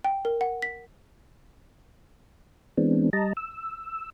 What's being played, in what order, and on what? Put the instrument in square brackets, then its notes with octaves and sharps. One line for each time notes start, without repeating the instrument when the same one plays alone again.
[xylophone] G5
A#4
F#5
B6
[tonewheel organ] E3 G#3 B3 C4 D4
G3 D#5 A5 A#5
E6